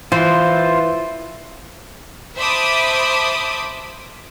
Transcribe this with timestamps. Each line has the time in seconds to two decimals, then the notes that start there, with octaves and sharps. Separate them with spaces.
0.12 E3 F4 C5
2.38 C5 E5 A5 B5 D6 D#6